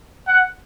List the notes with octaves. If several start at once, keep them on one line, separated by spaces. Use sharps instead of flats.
F#5